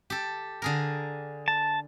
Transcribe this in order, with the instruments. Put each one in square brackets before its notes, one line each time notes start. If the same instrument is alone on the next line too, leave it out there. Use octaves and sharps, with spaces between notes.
[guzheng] G4 A4
D3 G#4 A#4
[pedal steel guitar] A5